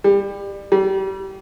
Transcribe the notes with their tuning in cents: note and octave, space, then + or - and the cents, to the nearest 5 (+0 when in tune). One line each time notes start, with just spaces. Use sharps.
G3 +25
G3 -30